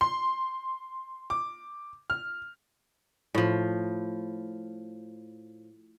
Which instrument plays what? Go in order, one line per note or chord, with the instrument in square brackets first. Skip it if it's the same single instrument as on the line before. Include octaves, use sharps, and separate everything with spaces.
[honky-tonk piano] C6
D6
F6
[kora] A2 F3